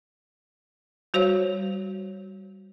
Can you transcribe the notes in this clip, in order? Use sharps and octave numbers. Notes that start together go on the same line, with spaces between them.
G3 F#4 C5 C#5 F5